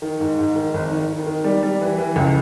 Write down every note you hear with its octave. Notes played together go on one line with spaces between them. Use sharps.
D#3
G#2
G#2
D#3
G#1
D#3
D#3
D#3
G3
G3
E3
E3
C#2